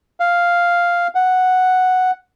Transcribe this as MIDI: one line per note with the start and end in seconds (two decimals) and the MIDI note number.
0.20 1.07 77
1.15 2.11 78